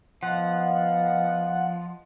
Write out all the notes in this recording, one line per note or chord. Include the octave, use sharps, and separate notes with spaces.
F3 B3 D#5 F5 F#5